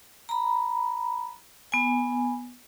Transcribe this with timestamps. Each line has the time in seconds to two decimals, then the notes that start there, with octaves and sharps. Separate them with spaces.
0.29 A#5 B5
1.72 B3 G#5